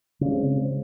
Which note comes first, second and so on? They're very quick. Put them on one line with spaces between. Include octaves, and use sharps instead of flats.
C#3 D4 G#3 C4